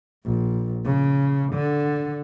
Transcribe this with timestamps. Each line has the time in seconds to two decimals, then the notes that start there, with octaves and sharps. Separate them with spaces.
0.24 A#1
0.85 C#3
1.53 D3